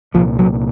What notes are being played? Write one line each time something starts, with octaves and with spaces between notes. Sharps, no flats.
C2 A#2 F3
F#3